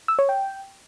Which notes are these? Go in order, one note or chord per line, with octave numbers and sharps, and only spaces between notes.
E6
C#5
G5